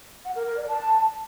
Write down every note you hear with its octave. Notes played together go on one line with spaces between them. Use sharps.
F#5
A#4
A#4
D5
A5